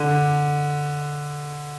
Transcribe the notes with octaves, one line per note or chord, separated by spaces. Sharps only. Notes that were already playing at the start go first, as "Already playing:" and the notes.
Already playing: D3